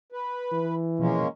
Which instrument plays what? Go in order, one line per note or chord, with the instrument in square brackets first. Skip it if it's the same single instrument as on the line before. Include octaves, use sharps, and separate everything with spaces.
[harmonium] B4
[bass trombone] E3
[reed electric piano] B2 F3 [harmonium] G#3 A#3 C#4